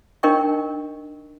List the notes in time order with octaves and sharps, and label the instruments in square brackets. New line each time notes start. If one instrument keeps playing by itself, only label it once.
[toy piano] D4 D#4 A#4 D#5 G5 C#6